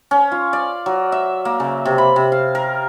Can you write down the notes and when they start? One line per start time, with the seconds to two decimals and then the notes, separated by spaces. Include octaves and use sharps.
0.11 C#4
0.32 F4
0.53 D5
0.86 F#3
1.12 E5
1.45 A#3
1.60 C#3
1.85 C3
1.98 B5
2.16 C3
2.32 F5
2.55 A#4